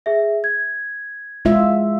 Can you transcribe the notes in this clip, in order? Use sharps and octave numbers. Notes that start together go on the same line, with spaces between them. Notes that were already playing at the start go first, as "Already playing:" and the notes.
G#4 E5
G#6
G#3 F4 E5